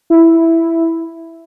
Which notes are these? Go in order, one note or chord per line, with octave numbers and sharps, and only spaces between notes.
E4